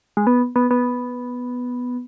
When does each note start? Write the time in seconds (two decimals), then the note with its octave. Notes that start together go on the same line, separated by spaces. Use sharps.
0.17 G#3
0.27 B3
0.56 B3
0.71 B3